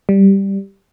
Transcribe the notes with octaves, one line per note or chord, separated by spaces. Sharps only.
G3